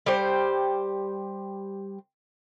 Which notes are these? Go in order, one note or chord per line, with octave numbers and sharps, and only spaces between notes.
G3 G4 C5